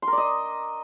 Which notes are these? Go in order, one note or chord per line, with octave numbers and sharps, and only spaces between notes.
C6
A#4
D5
D#5